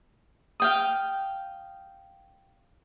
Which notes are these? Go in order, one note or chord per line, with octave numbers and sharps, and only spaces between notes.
F5 G5 D#6